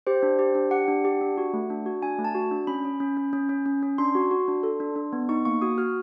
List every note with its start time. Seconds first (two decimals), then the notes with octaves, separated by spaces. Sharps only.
0.07 G4 C5
0.23 D4
0.39 G4
0.55 D4
0.71 G4 F#5
0.88 D4
1.05 G4
1.21 D4
1.38 F#4
1.53 A3
1.70 D4
1.86 F#4
2.02 D4 G#5
2.19 A3
2.25 A5
2.35 F#4
2.51 D4
2.67 C#4 B5
2.85 C#4
3.00 C#4
3.17 C#4
3.33 C#4
3.49 C#4
3.66 C#4
3.83 C#4
3.98 D4 C6
4.15 F#4
4.31 F#4
4.48 D4
4.63 A4
4.80 D4
4.96 D4
5.13 B3
5.29 D#4 C#6
5.45 A#3 C#6
5.62 F#4 D#6
5.78 F#4 F6